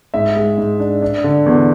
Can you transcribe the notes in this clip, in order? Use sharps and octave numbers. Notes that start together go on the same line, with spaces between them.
G#2 E5
G#3
G#2
D4
D4
D3
E2